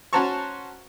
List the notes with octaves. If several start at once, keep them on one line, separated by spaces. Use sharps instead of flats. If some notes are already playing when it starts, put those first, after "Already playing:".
C#4 F#4 C5 A5 A#5 C#6